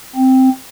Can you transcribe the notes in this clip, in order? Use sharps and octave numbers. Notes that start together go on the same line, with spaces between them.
C4